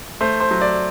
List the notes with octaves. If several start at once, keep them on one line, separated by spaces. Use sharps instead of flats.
A3 C5
C5
F#3
D5